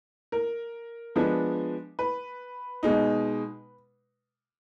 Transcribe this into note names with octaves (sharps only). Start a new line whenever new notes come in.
A#4
F3 G#3 B3 D4
B4
B2 G#3 D#4